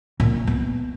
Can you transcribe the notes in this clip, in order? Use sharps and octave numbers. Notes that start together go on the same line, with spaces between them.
A#2
B3